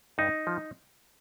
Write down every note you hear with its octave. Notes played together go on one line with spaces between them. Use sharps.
G2 D#4
F3